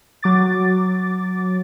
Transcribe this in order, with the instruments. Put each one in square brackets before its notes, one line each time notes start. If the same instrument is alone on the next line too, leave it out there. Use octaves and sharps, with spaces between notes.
[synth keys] F#3 D6 A6